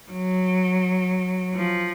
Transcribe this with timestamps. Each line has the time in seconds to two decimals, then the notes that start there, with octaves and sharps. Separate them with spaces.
0.12 F#3
1.55 F3